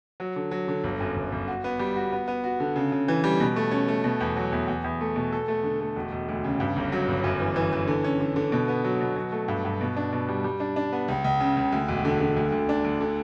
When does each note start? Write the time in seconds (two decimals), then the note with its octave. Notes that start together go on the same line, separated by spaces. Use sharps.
0.20 F#3
0.36 D3
0.51 F#3
0.68 D3
0.84 G1
1.00 F#2
1.16 G1
1.32 G1
1.48 F#4
1.64 B3
1.79 G3
1.96 F#4
2.12 B3
2.28 B3
2.44 F#4
2.60 D3
2.76 C#3
2.92 C#3
3.08 E3
3.24 G3
3.40 B2
3.56 A3
3.71 C#4
3.88 A3
4.04 B2
4.20 E2
4.37 F#3
4.52 E2
4.68 E2
4.84 E2
5.01 A3
5.16 B2
5.33 A4
5.48 A3
5.64 D3
5.81 A3
5.96 E1
6.12 E1
6.29 D2
6.44 C#3
6.60 G2
6.76 G1
6.92 F#3
7.08 G1
7.24 F#2
7.40 E3
7.56 E3
7.73 E3
7.88 D3
8.04 C#4
8.20 D3
8.36 D3
8.52 B2
8.68 B3
8.84 F#3
9.00 B2
9.16 F#3
9.32 A3
9.48 G2
9.65 G2
9.81 B2
9.97 D4
10.12 B2
10.29 G3
10.44 G3
10.60 D4
10.76 D4
10.92 B3
11.08 C#2
11.24 C#2
11.40 C#3
11.57 C#2
11.72 D2
11.88 E1
12.05 D3
12.20 D3
12.37 D2
12.52 D2
12.69 D4
12.84 D2
13.01 D3